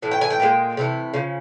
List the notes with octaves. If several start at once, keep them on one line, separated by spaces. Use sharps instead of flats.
A2 E3
G5
G#5
G5
A#2 F3 G#3
C3 E3 A3
C#3 F3